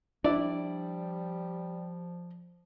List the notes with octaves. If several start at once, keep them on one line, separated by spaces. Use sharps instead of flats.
F3 G3 D4 E4 D5